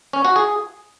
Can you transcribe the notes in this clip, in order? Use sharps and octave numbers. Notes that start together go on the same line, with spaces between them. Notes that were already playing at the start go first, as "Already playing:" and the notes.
C#4
F#4
G#4